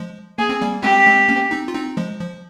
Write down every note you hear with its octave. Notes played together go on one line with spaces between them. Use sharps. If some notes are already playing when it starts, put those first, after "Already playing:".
Already playing: F3 G#3
A#3 G#4
C4
G3 A#3
G#3 C4 G4
G#3 C4
A#3 C#4
C4 D#4
F4
C4 D#4
F3 G#3
F3